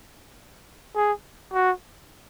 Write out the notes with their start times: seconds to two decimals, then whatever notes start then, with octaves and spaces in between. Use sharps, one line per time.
0.95 G#4
1.54 F#4